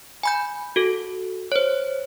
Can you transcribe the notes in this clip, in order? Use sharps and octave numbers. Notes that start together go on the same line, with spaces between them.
G#5 B5 G6
F#4 A4
C5 C#5